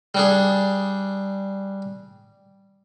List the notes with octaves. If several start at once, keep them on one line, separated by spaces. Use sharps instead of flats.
G3 D4 G#4